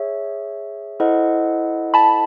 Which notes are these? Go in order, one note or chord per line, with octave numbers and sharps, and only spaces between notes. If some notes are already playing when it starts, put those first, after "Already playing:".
Already playing: G#4 C#5 E5
E4 A4 C5 D#5 F#5
A5 B5